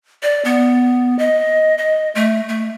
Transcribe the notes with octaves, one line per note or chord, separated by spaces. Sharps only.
D5
B3
D#5
D#5
A3
A3